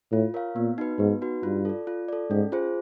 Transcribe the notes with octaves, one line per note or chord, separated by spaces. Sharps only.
A2 F4
A#4 C#5 F5
A#2 B3
D#4 F#4 B4
G#2 B3
D#4 F#4 B4
G2 F4
A4 D5
F4
A4 D5
G#2 C#4
F4 G#4 C5